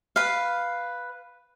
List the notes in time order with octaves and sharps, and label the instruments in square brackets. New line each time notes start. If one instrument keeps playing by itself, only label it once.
[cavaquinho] B4 F5